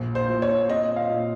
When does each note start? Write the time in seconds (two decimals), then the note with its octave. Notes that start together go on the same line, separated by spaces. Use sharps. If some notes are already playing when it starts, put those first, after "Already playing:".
Already playing: A#1
0.15 C5
0.29 A#2
0.42 C#5
0.69 C4 D#5
0.96 F5
1.10 A#2